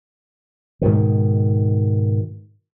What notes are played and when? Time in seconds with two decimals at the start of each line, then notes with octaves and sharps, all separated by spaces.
0.81 G#2 B2 D#3